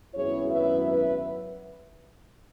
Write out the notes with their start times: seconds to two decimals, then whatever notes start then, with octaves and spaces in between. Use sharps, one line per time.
0.15 G#1 F#2 F#3 B3 E4 G#4 C#5
0.51 B4 E5
0.88 B4 E5